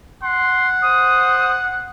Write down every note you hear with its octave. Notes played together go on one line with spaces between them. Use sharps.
F#5 C6
C5 D#6